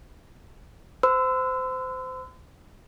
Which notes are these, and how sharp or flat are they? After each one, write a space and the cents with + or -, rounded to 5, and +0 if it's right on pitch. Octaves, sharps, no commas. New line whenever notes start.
C5 -25 C6 -45 E6 +0